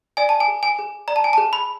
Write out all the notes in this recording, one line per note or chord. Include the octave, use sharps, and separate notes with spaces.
D5 G#5
A5
G#5
G#4
G#5
G#4
D5 A#5
A5
G#5
A5
G#4
B5